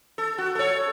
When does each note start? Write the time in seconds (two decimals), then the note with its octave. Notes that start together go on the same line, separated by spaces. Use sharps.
0.18 A4
0.38 F#4
0.55 A4 C#5